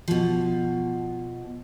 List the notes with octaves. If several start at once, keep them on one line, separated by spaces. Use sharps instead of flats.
B2 F3